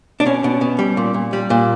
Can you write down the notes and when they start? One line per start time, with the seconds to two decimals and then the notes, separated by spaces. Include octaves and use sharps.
0.20 D4
0.26 B2 C#4
0.44 B2
0.61 B2
0.79 G3
0.97 A#2
1.14 A#2
1.33 G3
1.50 A#2